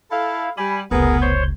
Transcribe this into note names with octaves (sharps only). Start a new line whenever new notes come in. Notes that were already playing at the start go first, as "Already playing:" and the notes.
E4 A4 F5
G3 G#5 B5
F1 C#2 B3 G#4 A#4
C5 C#5 C6